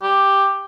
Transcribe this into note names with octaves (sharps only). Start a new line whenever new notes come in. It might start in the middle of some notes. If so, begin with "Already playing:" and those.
G4